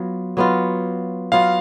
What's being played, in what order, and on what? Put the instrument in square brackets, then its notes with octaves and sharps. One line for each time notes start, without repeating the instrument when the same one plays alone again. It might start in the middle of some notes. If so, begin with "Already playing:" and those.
Already playing: [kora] F#3 B3 F4
F#3 B3 F4
[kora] F#3 B3 F4 [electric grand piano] F5